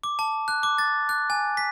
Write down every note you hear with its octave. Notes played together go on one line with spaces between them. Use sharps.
D6
A5
F#6
D6
A6
F#6
G#5
B6